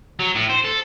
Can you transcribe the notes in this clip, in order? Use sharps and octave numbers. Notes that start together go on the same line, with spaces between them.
F#3
A2
C5
A4